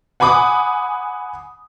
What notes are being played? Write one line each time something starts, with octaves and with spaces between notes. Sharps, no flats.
F#5 G#5 B5 D6 D#6